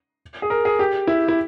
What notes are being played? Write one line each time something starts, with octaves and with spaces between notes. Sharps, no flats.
G#4
A#4
G#4
G4
E4
E4